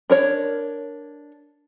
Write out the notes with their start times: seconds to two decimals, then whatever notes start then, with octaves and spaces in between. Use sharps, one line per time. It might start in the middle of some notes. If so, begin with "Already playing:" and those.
0.10 D4 A#4 C#5